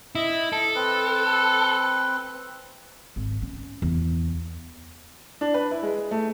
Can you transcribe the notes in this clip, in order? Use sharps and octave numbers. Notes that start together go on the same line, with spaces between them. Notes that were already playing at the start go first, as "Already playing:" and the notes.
E4 D#5
A4
C4 B4
G#1
C#4
E2
D4
B4
E4
G#3
A3